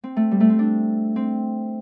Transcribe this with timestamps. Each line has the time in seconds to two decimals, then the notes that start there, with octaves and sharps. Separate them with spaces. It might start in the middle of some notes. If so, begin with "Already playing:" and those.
0.04 C4
0.16 A3
0.31 G3
0.40 A3
0.49 C4
0.59 D4
1.16 C4